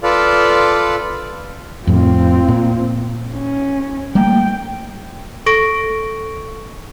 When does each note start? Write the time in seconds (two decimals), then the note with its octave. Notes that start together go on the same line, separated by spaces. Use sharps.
0.03 F4 A4 B4 D5 F5
1.87 F2 A2 C4 F4
2.48 A#2
3.34 C#4
4.15 G3 A3 A#3 G5
5.46 A4 C#6 A#6 D7